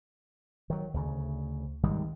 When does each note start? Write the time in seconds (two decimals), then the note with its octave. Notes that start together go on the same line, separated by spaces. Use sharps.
0.70 D#3 F#3
0.94 D2 C#3
1.83 G#1 D#3 G3 G#3